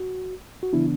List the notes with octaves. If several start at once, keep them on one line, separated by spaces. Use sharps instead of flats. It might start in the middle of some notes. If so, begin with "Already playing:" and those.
Already playing: F#4
F#4
C#3 E3 B3 D4 E4